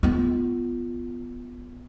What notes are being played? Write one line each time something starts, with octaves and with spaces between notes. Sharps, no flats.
B3 F4